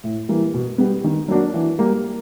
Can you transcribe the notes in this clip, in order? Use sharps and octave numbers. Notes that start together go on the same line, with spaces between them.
A2
E3 G3 A#3
B2
G3 B3
D#3
F#3 A#3 D4 F#4
E3
G3 A#3